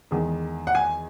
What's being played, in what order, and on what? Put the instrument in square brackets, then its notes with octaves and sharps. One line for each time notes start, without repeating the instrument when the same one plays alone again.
[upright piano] E2 D#3 G#3
F#5
G#5